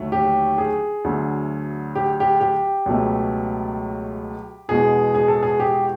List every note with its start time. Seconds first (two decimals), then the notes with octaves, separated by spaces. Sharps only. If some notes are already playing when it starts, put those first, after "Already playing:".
Already playing: D#2 D3 F#3 A3
0.12 G4
0.58 G#4
1.04 D2 D3 F#3 A3
1.95 G4
2.20 G4
2.40 G4
2.86 C#2 B2 F#3 A3
4.69 E2 B2 G#3 G#4
5.15 G#4
5.28 A4
5.43 G#4
5.60 G4